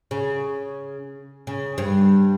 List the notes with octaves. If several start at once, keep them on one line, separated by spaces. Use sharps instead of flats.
C#3
C#3
G2